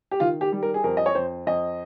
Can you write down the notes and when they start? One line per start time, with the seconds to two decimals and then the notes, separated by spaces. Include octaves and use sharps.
0.11 G4
0.20 D#3 F4
0.41 G4
0.52 G3
0.63 A#4
0.74 G#4
0.84 F2 A#4
0.97 D#5
1.06 C#5
1.15 F2 C5
1.46 F2 D#5